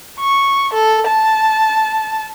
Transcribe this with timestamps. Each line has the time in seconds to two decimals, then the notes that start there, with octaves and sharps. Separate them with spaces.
0.20 C#6
0.74 A4
1.07 A5